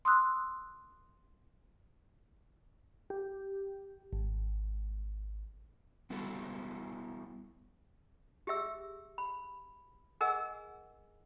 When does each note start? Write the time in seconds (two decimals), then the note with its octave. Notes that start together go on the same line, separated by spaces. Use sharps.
0.05 C6 D#6 E6 F#6
3.10 G4
4.13 G#1
6.10 G3 B3 E4 F#4 A4
8.47 G4 G#4 E5 E6
9.18 B5
10.21 G#4 A#4 D#5 F#5 G#5 E6